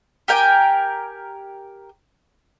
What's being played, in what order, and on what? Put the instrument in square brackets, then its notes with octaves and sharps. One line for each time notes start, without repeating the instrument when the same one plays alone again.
[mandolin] G4 A#4 G5 G#5